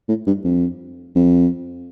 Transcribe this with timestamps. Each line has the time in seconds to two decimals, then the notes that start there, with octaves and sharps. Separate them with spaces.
0.08 A2
0.26 G2
0.44 F2
1.15 F2